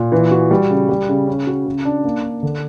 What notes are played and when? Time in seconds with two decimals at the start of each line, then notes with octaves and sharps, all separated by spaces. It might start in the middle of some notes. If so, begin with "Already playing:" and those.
Already playing: A#2
0.12 E3
0.31 F#4
0.51 G3
0.71 C#3
0.89 G3
1.09 C#3
1.27 C#4
1.47 F#4
1.66 C#3
1.85 D4
2.05 A#3
2.24 D4
2.43 D3